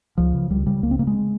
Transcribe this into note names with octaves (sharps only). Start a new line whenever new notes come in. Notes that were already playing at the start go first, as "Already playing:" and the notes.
C#2 F3
C#3
C#2 G3
C#3 G3
C#2 A#3
C4
C#3 A#3
G#3